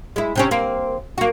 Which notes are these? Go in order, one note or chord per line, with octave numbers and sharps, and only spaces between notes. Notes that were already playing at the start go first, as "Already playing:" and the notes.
G#3 E4
C3 C4 C#4
A#3 C4
A#3 F#4